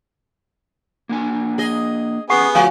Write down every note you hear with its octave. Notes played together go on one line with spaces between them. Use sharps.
A#3 D4 G#5
G#4 D#5
B3 C#4 G4 G#4 B4 F#5 C#6 C7
D2 F3 F4 F#4 F5 G#5